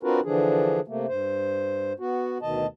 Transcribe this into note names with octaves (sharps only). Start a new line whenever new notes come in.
C4 D4 F4 F#4 A#4 B4
D3 E3 F3 D4 G#4
C3 A3 A#3
G2 C5
B3 F#4
D2 B2 D#3 D#5 A5